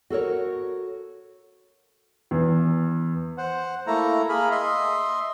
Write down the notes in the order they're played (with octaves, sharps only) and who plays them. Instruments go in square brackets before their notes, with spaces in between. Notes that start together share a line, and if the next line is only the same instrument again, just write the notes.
[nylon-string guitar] F#4 A4 A#4 C#5
[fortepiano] E2
[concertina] C5 F#5
A3 A#3 E4 A4 A#5
A#3 G#4 A#4 B5
D#5 E5 C6